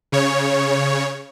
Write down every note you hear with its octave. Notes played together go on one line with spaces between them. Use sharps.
C#3 C#5